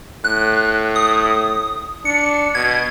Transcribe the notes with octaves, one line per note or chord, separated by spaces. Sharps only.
A2 F#6
D#6
D4 C#7
B2 G#6